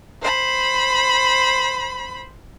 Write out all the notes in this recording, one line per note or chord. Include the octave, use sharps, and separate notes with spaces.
C5 B5